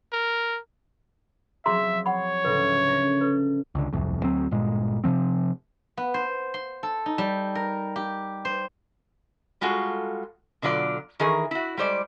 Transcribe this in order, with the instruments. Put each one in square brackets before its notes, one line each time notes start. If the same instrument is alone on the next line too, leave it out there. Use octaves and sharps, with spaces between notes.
[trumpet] A#4
[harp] F3 F#3 C4 [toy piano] G#4 A#5 C6 [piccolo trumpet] E5
[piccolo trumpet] C#5 [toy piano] F#5 B5
[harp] D2 A2 C#3 [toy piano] B4
[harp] C#4 A#4
[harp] A4 [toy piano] B4
[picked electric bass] C#2 D3
D1 C2 F2
D2 F#3 C4
G1 A#2 G#3
C3 E3 F3 C4
[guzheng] B3
C5
C6
A4
D#4
G3
A#4
G4
C5
[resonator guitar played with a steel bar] G3 G#3 F4 F#4 A4
B2 D3 F#3 F4 D5
D#3 E3 G#4 A#4
E4 F#4
G3 G#3 C5 D5